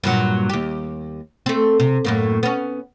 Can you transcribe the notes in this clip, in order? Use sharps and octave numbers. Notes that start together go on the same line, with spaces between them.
G2 A#2 F#3
D#2 G4
A3 C4
C3
F#2 A2 A#3
B3 C#4